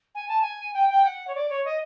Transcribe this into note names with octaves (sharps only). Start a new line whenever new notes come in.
G#5
A5
G#5
G5
G5
F#5
C#5
D5
C#5
D#5